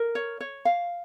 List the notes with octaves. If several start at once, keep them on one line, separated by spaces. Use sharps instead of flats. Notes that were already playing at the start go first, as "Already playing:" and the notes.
Already playing: A#4
C#5
C#5
F5